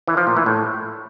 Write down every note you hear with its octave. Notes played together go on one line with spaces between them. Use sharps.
E3
F3
A#2
E3
A2